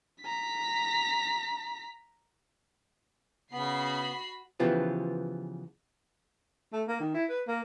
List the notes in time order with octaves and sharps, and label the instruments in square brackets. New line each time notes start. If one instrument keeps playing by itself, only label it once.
[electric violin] A#5 B6
[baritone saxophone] C#3 [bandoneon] B3 [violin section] F#4 B5 C7
[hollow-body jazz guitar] C#3 E3 F3 B3 F4 G4
[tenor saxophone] A3
A#3
D#3
E4
B4
A#3